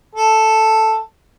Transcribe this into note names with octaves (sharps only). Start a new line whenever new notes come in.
A4